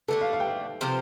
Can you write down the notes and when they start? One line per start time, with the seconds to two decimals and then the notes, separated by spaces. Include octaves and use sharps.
0.08 D3 A3 D4 A4
0.21 F5
0.33 F5
0.40 G5
0.47 F5
0.81 C3 F3 C4 G4